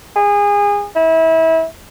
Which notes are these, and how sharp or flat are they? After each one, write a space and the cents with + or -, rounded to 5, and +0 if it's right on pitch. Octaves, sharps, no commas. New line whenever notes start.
G#4 -25
E4 -30